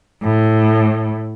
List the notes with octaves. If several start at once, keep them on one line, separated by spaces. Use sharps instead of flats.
A2